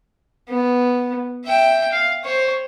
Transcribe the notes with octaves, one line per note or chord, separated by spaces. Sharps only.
B3
E5 G5
F5
C5 C#5